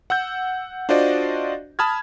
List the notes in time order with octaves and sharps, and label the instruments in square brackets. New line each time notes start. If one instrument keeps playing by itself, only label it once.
[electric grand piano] F#5 E6 G6
D4 F4 F#4 C5 D5 D#5
A5 B5 D#6 F6 G#6